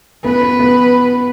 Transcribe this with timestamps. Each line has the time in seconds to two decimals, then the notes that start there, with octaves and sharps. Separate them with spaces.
0.25 B3 B4
0.42 B3
0.59 B3